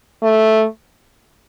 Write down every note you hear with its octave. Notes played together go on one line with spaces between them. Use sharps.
A3